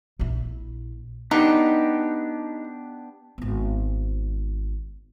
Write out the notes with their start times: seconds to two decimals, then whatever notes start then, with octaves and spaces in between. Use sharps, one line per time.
0.19 A#1 E4
1.31 B3 D4 D#4 G4
3.38 G#1 B3